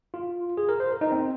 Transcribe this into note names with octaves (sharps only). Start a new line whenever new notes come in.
F4
G#4
A#4
C5
A#4
D#4
C4